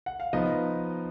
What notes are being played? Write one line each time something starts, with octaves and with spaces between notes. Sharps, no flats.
F#5
F5
F3 B3 D#4 D#5